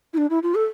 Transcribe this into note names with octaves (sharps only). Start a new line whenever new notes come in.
E4
D4
E4
F4
A4